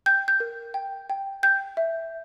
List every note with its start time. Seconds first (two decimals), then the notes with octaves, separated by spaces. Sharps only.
0.06 G5 G6
0.28 G6
0.40 A#4
0.74 G5
1.10 G5
1.43 G5 G6
1.77 E5